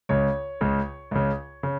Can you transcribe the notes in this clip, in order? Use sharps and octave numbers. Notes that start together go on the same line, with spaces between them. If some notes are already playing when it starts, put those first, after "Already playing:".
C#2 C#3 C#5
C#2 C#3
C#2 C#3
C#3